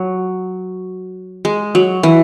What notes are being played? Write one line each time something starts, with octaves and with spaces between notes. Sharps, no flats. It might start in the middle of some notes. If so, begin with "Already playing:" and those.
Already playing: F#3
G#3
F#3
E3